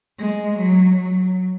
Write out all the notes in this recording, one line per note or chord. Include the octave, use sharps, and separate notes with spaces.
G#3
F#3
F#3